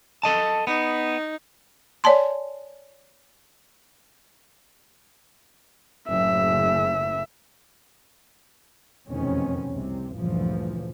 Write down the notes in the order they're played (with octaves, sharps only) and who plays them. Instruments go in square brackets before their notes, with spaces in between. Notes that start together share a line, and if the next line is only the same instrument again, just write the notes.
[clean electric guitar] A4 D#5 A5
[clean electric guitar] B3 [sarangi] D#4
[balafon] C#5 D5 G#5 A5 C6
[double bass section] F#1 A2 C#3 [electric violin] E5
[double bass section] F1 E2 B2 D#3 C4 C#4
C2 C3
D2 G2 A#2 C#3 E3 F3